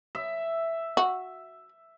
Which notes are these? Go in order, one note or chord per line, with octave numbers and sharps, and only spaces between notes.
E5
F#4